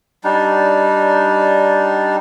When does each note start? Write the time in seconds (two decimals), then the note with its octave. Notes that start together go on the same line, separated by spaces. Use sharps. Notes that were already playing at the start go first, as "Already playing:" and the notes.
0.24 G3 D4 D#4